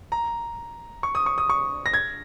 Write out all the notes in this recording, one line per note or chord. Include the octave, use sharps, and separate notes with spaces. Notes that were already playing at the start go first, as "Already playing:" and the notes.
A#5
C#6
D#6
C#6
D#6
C#6
A#6
G#6